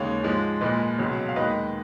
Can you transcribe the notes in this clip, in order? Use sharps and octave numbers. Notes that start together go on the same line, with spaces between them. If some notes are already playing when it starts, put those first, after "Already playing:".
Already playing: D#2 C#3 G#3 C#5 F5
G#2 F3 G#3
A#2 F3 G#3 B4 D#5
C#2 B2 F#3
F5
D#2 D#3 G#3 B4 D#5